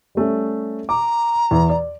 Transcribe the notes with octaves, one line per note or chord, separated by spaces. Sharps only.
G3 A3 C#4
A#5 D6
E2
D5